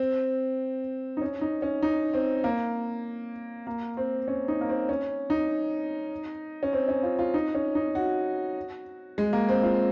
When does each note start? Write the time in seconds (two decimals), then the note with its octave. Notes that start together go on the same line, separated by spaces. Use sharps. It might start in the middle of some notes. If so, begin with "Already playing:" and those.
Already playing: C4
1.17 D#4
1.21 C#4
1.41 D#4
1.62 C#4
1.83 D#4
2.14 C4
2.44 A#3
3.67 A#3
3.97 C4
4.28 C#4
4.48 D#4
4.61 A#3
4.69 C4
4.89 C#4
5.30 D#4
6.63 C#4
6.73 C4
6.88 C#4
7.03 F4
7.19 F4
7.34 D#4
7.55 C#4
7.75 D#4
7.95 F#4
9.18 G#3
9.33 A#3
9.49 C4
9.63 F4